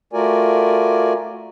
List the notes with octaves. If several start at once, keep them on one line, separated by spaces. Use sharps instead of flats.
A3 F4 F#4 A#4 D5 G#5